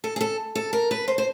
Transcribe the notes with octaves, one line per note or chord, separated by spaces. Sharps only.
A4
G#4
A4
A4
A#4
B4
C5
C5